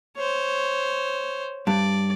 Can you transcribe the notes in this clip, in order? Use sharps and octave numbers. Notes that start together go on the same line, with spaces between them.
C5 C#5
G2 D5